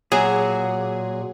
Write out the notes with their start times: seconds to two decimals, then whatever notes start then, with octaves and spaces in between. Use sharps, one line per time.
0.12 A#2 F#3 G#4